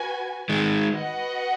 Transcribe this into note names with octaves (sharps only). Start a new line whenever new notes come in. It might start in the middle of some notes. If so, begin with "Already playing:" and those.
Already playing: F#4 B4 G#5
D#3 G#3
F#4 B4 D#5 F#5